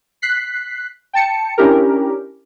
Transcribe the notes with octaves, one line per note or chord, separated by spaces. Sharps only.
F#6 B6 C7
G5 A5 C#7
C#4 D4 E4 G4 A#4